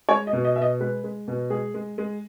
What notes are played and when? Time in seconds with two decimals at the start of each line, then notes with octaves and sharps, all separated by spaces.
0.09 G#3 C#5
0.27 D#5
0.33 B2
0.44 D#5
0.56 B2 E5
0.62 D#5
0.80 G#3 B4
1.04 G#3
1.28 B2
1.50 G#3 G#4
1.74 G#3
1.98 G#3